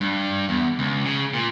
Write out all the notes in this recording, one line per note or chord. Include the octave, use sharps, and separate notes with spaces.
G2
E2
C#2
C#3
A#2